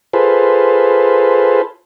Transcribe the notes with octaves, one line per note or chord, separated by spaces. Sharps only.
F4 G#4 A4 B4 C5